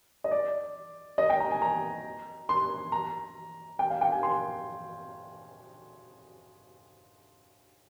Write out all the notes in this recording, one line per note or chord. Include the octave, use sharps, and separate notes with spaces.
D#5
D5
D#5
G5
A#5
G#5
A#5
C6
A#5
G5
F5
G5
G#5
C6